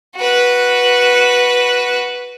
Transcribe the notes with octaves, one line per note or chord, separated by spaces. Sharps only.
F#4 B4